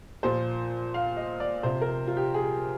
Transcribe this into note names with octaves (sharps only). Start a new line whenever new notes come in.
A#2 F3 C5
F5
D#5
D5
C3 F3 C5
A#4
F4
G4
G#4